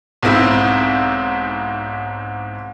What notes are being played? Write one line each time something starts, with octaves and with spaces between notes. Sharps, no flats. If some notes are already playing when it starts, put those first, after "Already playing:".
B1 G#2 C4 E4